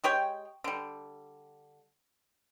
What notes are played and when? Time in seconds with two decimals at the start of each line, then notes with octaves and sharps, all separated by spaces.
0.04 G#3 G4 C#5 G5
0.64 D3 G3